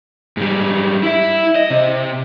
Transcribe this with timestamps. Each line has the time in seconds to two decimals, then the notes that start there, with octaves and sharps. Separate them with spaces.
0.37 G#2 G3
1.03 E4 E5
1.56 D#5
1.70 C3